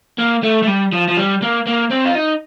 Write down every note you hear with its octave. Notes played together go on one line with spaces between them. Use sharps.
A#3
A3
A3
G3
F3
F3
G3
A#3
A#3
C4
F4
D#4